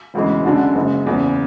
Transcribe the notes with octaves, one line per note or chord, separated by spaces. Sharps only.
E1 D2 C#3 E3 G#3
F#2 D3 G#3 D4 F#4
F#1 F#2 C#3 G#3
F#1 E2 C#3